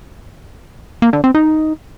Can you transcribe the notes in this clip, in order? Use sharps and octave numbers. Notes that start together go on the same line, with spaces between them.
A#3
D3
C4
D#4